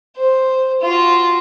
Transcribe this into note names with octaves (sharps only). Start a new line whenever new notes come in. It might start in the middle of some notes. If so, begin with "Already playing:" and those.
C5
F4 F#4